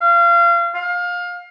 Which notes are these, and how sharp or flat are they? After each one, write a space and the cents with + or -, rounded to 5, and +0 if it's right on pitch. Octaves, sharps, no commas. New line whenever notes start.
F5 -30
F5 +25